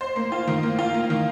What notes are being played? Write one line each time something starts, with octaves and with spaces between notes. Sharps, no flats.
C5
A#3
F4
D#3
A#3
F4
A#3
D#3